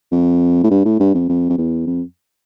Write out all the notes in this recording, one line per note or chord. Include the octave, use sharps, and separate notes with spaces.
F2
A2
G2
A2
G2
F2
F2
F2
E2
F2